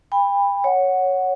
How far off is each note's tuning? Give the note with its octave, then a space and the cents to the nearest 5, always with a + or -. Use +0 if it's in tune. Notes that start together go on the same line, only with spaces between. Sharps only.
G5 +35 B5 +0
C#5 +0 F#5 +0